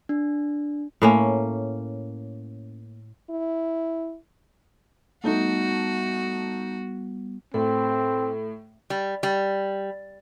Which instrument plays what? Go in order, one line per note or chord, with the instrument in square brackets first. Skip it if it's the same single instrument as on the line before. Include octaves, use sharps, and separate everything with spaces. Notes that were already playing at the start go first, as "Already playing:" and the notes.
[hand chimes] D4
[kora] A2 A#3 C#4
[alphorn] E4
[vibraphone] G3 B3 [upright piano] A3 D#4 [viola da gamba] F#4
[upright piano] A2 [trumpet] C4 [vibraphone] A4
[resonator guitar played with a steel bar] G3
G3